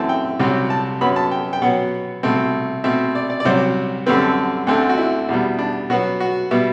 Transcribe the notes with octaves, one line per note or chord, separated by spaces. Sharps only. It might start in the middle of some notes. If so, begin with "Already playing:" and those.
Already playing: F#2 E3 A3 C4 A5
G5
C2 C3 F#3 C4
A5
F#2 F#3 B3 B5
A5
G5
G5
B2 F#3 B3 F#5
C2 B2 A3 C4
B2 A3 C4 E5
D5
D5
D5
C2 C3 F#3 C4 C5
F#2 D3 G3 C4 B4
A4
D2 D3 A3 C4
F#4
E4
E2 B2 G3
D4
B2 F#3 B3 F#4
F#4
B2 G3 B3 E5